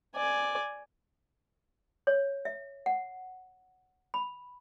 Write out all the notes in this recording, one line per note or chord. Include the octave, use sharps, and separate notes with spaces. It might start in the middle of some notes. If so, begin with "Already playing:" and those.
D5 G#5
C#5
E5
F#5
B5